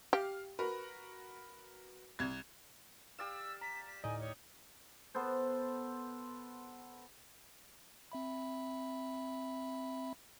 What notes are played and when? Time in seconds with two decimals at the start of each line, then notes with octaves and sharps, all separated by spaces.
0.13 G4 F5
0.59 F#4 A#4 B4
2.19 C2 G#6
3.19 G4 D5 F5 E6 E7
3.61 A#5 B6
3.87 B6
4.04 D2 A2 D#4 D5 D#5 G#5
4.19 C#5
5.15 B3 A4 C5
8.12 C4 E5 B5